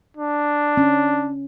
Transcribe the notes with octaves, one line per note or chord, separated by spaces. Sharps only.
D4
C#4